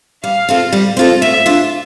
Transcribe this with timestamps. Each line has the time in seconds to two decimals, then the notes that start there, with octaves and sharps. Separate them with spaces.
0.24 G3 F5
0.49 C4 F4 A4
0.72 G3
0.97 C4 F4 A4
1.22 A3 E5
1.46 D4 F4